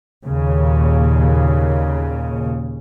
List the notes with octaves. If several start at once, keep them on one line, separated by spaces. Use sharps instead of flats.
D#2 A#2 C#3